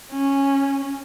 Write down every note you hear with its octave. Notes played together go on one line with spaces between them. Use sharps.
C#4